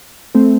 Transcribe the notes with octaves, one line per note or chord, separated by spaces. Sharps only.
A3 C4